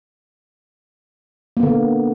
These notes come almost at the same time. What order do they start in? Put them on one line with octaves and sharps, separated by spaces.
A#3 B3 D3